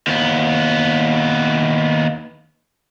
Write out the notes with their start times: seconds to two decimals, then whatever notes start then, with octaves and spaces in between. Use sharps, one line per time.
0.07 D#2 B3